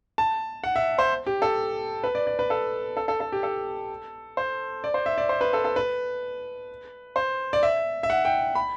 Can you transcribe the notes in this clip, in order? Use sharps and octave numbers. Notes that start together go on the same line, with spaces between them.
A5
F#5
E5
C5
G4
A4
B4
D5
D5
B4
A4
A4
A4
A4
G4
A4
C5
D5
C5
E5
D5
C5
B4
A4
A4
B4
C5
D5
E5
E5
F#5
G5
B5